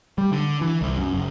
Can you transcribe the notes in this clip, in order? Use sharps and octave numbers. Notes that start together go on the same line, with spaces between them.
G3
D3
E3
C2
F#2
F#1